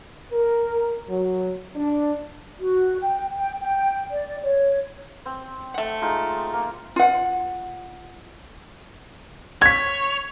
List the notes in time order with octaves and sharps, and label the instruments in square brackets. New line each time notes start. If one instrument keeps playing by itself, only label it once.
[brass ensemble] A#4
F#3
D4
[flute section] F#4
G5
G5
G5
D5
C#5
[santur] C4
[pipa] A3 F#5
[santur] G#3 D#4 F4
A#3
[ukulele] F4 F#5
[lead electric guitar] C#5 [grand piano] G#6 B6